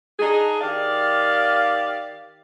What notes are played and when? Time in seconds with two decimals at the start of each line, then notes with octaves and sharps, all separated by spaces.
0.20 D4 D#4 G#4
0.61 D#3 G4 D5 F5